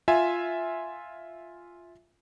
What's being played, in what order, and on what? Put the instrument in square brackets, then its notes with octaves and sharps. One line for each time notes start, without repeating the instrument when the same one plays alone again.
[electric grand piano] F4 E5 G#5